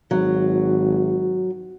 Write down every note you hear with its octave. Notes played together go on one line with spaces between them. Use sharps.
G#1 F#3